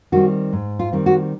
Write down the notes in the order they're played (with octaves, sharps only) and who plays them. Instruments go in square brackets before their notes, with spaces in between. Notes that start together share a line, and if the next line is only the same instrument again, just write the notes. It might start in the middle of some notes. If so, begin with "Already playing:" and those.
[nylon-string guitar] D#3 G3 C4 F#4
G#2
F4
D#3 G3 C4
F#4